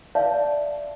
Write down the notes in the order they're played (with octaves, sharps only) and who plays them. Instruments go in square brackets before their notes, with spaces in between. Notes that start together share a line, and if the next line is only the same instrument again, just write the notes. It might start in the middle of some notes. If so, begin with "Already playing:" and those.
[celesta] D5 E5 F5 A5